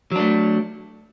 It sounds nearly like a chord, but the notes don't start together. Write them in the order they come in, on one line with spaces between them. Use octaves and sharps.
F#3 D4 A3